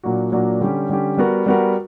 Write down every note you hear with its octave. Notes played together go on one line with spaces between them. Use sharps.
A#2 F#3 A#3 D4 F#4
A#2 F#3 A#3 D4 F#4
D3 G3 C#4 G4
D3 G3 C#4 G4
G3 B3 F#4 A#4
G3 B3 F#4 A#4